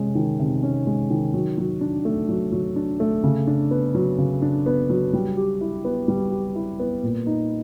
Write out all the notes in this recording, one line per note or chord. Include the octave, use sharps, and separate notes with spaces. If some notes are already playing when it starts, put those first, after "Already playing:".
Already playing: C3 G#3 C#4
D#3
C3
C#4
G#3
D#3
F#3
F#3
D4
A3
F#3
F#3
D4
A3
C#3
D4
B3
F#3
C#3
D4
B3
F#3
G3
G4
E4
B3
G3
G4
E4
B3
A#2
D#4